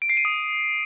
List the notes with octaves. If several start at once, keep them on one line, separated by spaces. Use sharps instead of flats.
D7
C7
D#7
D#6